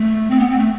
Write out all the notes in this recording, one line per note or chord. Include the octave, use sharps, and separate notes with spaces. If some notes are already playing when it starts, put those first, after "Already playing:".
Already playing: A3
C4
B3
C4
A3